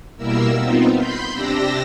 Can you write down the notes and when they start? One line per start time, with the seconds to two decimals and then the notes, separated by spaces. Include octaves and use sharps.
0.17 B2 G3 A#3 E4 A#4 E6
0.55 B3 C4 D#4 F4
0.97 B5 C6 G6
1.33 C3 D4 G4 E6 A#6